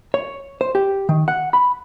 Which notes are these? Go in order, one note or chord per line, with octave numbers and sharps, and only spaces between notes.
C#5
C5
G4
D#3
F#5
B5